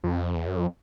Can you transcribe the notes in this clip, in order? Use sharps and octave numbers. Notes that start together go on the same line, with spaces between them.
F2
E2
F#2
F2